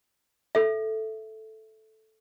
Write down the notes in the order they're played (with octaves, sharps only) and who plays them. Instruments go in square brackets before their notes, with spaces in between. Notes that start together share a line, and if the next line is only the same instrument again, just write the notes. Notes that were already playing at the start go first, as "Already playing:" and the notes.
[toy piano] A4 E5